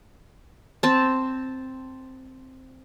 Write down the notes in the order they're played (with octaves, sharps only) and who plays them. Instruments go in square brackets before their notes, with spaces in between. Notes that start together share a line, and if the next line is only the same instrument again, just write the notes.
[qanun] C4 A5